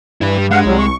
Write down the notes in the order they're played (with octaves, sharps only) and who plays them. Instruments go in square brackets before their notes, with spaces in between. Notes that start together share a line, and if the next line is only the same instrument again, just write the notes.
[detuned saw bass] G2 [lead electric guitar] E4 B4
[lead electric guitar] G3
[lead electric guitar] G#3 [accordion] F5 F#5
[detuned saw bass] C2 [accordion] F#3 G3
[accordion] C#6